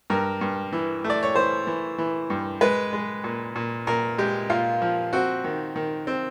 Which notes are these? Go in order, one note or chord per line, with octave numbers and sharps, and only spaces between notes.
G2 A#4
G2
E3
A3
D5
C#5
E3 C5
E3
E3
G2
G#3 B4
G#3
A#2
A#2
A#2 A#4
G#3 G4
A#2 F4
F3
C4 F#4
D#3
D#3
C4